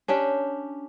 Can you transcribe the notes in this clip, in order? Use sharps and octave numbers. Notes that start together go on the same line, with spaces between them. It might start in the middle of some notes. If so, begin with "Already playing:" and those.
C#4 D4 G4